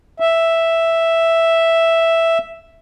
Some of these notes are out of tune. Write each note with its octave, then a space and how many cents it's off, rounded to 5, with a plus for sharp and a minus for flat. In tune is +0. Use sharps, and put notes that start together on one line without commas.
E5 +0